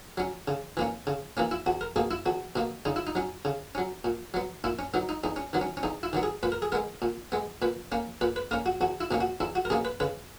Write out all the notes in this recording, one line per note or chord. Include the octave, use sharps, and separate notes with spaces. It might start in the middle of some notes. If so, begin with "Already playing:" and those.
F#3 C#4
C#3
E3 A#3 C#4
C#3
E3 A#3 C#4
E4
E2 F#4
A#4
B2 A#3 G#4
E4
E2 F#4
B2 A#3
C#3 D#4
E4
D#4
F#3 C#4
C#3
F#3 C#4
A#2
F#3 B3
A#2 E4
C#4
F#3 B3 D#4
D#4
E2 D#4
C#4
D#3 F#3 B3
C#4
C#4
E2 D#4
E4
D#3 F#3 B3
G#4
A#2 B4
A#4
G#4
G#3 B3 A#4
A#2
G#3 B3
A#2 B4
A#3 C#4
A#2 B4
B4
A#3 C#4 A#4
F#4
E2 F#4
E4
B2 A#3 C#4
F#4
E2 E4
F#4
A#4
B2 A#3 C#4 G#4
B4
C#3 B4